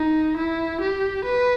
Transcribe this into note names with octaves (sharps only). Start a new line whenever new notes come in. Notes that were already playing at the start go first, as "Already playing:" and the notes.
Already playing: D#4
E4
G4
B4